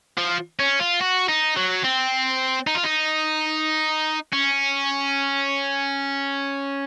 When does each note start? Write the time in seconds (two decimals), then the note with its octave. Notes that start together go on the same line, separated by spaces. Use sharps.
0.18 F3
0.59 C#4
0.80 F4
1.01 F#4
1.28 D#4
1.56 F#3
1.83 C4
2.67 D#4
2.75 F4
2.84 D#4
4.33 C#4